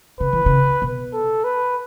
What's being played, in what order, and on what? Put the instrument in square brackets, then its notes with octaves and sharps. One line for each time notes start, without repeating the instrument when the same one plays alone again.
[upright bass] C#3 [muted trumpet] B4
[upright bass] E3
C#3
B2
[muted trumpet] A4
B4